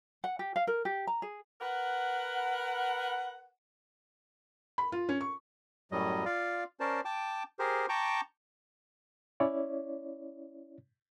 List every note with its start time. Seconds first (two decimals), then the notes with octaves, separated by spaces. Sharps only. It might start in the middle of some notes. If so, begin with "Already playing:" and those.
0.24 F#5
0.39 G4
0.56 F5
0.67 A#4
0.85 G4
1.07 A#5
1.22 G#4
1.61 A#4 B4 F#5
4.78 B5
4.92 F4
5.09 C#4
5.21 C#6
5.92 F#2 A2 F#3 G3 D#5
6.25 F4 D5 F5
6.80 C#4 A#4 C5 D5 A5
7.05 G5 A5 D6
7.59 G4 G#4 A#4 C5
7.89 G5 A5 A#5 C#6 D6 G6
9.40 C#4 E4 C#5 D5